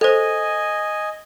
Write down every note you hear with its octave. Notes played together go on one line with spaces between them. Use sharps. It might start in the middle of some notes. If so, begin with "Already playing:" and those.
A4 C5 D#5 G#5